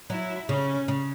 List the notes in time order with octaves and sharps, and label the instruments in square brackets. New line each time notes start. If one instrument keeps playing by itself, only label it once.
[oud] F#3 [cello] E4
[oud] C#3 [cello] C#4
[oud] C#3